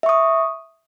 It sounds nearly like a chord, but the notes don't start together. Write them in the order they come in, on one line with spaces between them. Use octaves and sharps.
E5 C#6 D#6